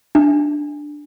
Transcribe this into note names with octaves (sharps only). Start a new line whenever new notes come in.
D4